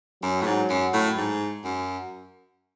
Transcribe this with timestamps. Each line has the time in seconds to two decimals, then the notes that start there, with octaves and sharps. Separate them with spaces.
0.23 F#2 F#3
0.42 A2
0.46 G#2
0.70 F#2
0.93 A2
1.17 G#2
1.64 F#2